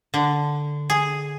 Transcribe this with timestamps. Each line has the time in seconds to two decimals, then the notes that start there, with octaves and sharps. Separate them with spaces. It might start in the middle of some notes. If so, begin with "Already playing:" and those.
0.14 D3
0.90 G#4